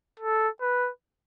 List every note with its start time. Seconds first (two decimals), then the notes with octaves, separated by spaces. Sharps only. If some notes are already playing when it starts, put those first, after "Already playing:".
0.20 A4
0.61 B4